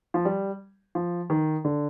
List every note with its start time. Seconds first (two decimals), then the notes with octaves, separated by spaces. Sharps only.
0.14 F3
0.25 G3
0.95 F3
1.30 D#3
1.65 D3